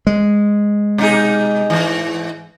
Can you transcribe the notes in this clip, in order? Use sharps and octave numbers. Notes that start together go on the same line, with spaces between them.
G#3
B2 D#4 G#4
G#2 E3